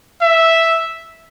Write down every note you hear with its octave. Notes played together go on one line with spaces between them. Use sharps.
E5